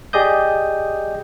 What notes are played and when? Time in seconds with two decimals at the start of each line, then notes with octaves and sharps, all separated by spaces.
0.13 G4 G#4 D5 D#5 D#6 G6